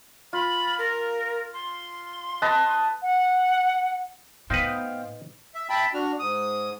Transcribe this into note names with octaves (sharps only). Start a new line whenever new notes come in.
F4 B5
A#4
C6
B4 D#5 A5
F#5
A2 B3 D#4 B4 C5 F5 G5
E5
E5 G5 A5 B5
D4 F#4 F6
G#2 D#6